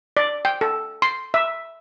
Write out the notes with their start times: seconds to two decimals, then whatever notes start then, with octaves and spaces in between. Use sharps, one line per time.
0.17 D5
0.45 G5
0.61 A4
1.02 C6
1.34 E5